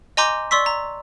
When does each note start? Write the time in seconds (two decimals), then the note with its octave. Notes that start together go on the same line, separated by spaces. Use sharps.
0.17 D#5 G#5 A#5 C6 D6 G6
0.51 D5 C6 C#6 E6 B6
0.66 A#5